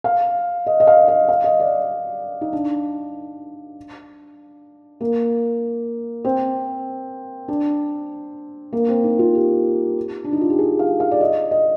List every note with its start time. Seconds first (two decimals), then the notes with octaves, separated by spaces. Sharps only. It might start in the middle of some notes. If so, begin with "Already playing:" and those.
0.04 F5
0.67 D#5
0.80 D#5
0.87 F5
1.08 D#5
1.28 F5
1.44 D#5
1.60 D5
2.41 D#4
2.53 D4
5.01 A#3
6.25 C4
7.48 D4
8.73 A#3
8.88 C4
9.04 D#4
9.19 F4
9.35 G4
10.24 D4
10.33 D#4
10.41 F4
10.50 G4
10.59 G#4
10.79 F5
11.00 F5
11.11 D5
11.21 D#5
11.51 D#5